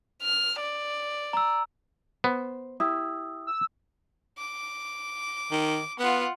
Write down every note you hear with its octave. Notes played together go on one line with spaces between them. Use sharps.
F6
D5
A#5 E6
B3 C5
E4 G4 D#6 E6
E6
D6
D#3
B3 F4 F#5